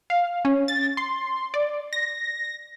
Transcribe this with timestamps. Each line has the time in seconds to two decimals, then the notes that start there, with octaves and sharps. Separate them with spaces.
0.10 F5
0.45 C#4
0.68 A6
0.97 C6
1.54 D5
1.93 A#6